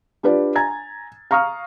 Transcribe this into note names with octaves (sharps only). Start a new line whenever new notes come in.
D4 F4 G4 B4 D5
G#5 A#5 G#6 A6
F5 A#5 C#6 D#6 F6